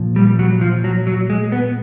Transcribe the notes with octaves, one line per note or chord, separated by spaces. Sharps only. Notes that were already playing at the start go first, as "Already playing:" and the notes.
Already playing: A#2 F3
G3
F#3
F3
F#3
F#3
G#3
B3